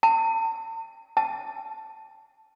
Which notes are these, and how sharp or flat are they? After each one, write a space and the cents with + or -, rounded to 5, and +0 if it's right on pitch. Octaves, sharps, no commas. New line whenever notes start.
A5 +40
A5 -5